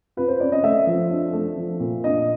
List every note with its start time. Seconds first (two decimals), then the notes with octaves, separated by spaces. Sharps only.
0.17 F4 B4
0.28 C5
0.40 C#4 D5
0.52 D#5
0.63 A3 E5
0.87 F3
1.10 D4
1.33 A3
1.57 F3
1.80 A#2
2.04 D4 D#5